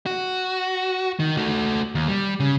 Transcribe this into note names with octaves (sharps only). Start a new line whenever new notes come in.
F#4
D#3
A3 F#4
D#2
G3
C#3